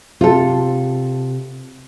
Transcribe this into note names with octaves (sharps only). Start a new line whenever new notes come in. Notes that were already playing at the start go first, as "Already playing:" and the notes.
C3 F4 A4